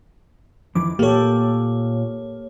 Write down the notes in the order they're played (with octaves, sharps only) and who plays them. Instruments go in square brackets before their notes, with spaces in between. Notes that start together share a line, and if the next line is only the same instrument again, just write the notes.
[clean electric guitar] F2 D#3 E3 [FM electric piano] D6
[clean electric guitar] A#2 [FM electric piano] A#3 C#5 [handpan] G4 A4